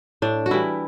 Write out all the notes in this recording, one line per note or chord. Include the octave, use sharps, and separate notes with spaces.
A2 D4
F#4
E3 G3 E4